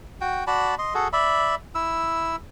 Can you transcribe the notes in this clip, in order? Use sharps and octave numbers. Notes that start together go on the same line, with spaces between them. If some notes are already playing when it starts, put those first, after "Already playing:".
F#4 G5
F#4 D5 A5 B5
D#5 C6
F#4 G#4 A4
D5 E5 B5
E4 E6